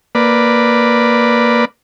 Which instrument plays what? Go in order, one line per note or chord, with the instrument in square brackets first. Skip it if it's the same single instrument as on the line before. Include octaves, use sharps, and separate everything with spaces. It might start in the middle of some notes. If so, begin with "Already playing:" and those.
[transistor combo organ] A#3 B4 D5